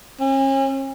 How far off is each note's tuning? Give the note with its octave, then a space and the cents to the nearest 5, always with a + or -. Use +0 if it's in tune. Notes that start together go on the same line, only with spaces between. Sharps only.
C#4 -40